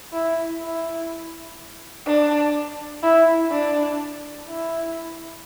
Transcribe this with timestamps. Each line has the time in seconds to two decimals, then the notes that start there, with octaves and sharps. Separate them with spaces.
0.13 E4
0.62 E4
2.06 D4
3.03 E4
3.51 D4
4.49 E4